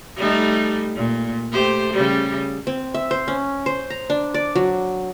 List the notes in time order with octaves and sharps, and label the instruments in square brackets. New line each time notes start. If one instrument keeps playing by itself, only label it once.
[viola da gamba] G3 A3 D#4
A#2
A3 G4 C5
C#3 G3
[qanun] C4
E5
C5
C#4
C5
A#5
D4
D5
F#3